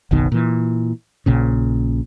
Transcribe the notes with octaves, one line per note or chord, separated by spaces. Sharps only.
F#1 B1 B2 D#3
A#2 E3
A#1 A#2 C#3